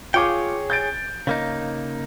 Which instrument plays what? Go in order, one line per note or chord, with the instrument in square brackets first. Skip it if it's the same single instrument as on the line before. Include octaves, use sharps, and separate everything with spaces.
[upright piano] F4 D6 [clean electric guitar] G#4 C#5 G5
[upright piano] G6 A6 D7
[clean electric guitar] C#3 A#3 D#4